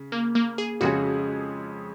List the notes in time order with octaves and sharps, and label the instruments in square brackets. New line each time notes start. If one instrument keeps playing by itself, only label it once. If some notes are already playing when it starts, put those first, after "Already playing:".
Already playing: [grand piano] C#3
[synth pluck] A#3
A#3
G#4
[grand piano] F2 C#3 G#3 C#4 G#4 [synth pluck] F#4